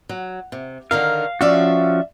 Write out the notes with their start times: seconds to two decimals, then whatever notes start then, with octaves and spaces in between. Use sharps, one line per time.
0.09 F#3
0.52 C3
0.91 D3 D#3 A#4 F5
1.41 F3 C#4 F#4 D5 E5 F5